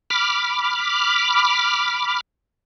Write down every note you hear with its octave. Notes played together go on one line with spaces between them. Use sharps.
B5 D6 F6